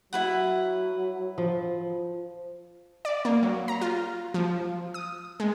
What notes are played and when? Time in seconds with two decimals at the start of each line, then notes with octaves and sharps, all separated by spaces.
0.13 F#3 E4 B4 F#5
1.38 F3
3.05 D5
3.25 A#3
3.43 F#3
3.68 A#5
3.81 F4
4.34 F3
4.94 D#6
5.40 G#3